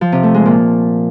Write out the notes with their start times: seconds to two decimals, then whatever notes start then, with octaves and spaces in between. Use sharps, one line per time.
0.01 F3
0.12 C3
0.23 A3
0.34 G#3
0.45 A#2